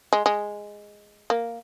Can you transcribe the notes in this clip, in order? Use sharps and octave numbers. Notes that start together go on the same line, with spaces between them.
G#3
G#3
A#3